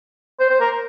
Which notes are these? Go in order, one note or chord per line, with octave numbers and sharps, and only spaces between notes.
C5
C5
A#4